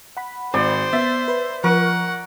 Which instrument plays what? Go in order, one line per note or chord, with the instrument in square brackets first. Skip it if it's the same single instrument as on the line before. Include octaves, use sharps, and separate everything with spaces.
[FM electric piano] F#5 B5
[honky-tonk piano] G#1 [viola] C5 [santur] D5
[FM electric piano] B3 A6 [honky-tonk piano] E5
[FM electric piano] B4
[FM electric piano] F3 [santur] A#4 [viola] F#5 [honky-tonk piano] C#6